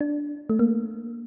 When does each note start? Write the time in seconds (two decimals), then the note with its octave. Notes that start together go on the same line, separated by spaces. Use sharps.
0.01 D4
0.49 A3
0.59 A#3